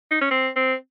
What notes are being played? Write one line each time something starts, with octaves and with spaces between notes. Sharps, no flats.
D#4
C#4
C4
C4